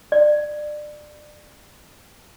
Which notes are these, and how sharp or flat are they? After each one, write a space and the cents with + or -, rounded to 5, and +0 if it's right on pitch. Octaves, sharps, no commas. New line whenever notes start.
D5 +25